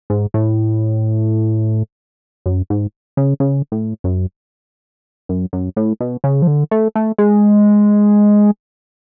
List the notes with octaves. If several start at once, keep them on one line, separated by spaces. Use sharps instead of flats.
G#2
A2
F#2
G#2
C#3
C#3
A2
F#2
F#2
F#2
A2
B2
C#3
F3
D3
A3
A3
G#3